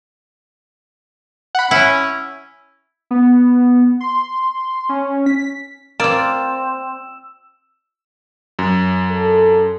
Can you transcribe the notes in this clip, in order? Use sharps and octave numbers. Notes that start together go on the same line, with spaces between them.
F#5 B5
C#4 E4 F#5
B3
C6
C#4
B6
A#3 C4 F4 D5 E6 E7
F#2
A4